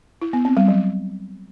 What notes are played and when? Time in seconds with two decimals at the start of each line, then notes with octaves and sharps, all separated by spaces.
0.22 E4
0.33 B3
0.45 C4
0.57 G3
0.68 F#3